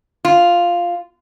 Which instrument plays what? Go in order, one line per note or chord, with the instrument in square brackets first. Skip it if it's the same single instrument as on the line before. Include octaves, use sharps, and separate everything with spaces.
[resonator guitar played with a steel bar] F4